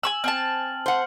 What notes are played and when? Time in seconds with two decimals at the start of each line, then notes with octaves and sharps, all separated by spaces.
0.03 G#5 C#6 E6 F#7
0.24 C4 G#5 A5 F6
0.86 C5 F#5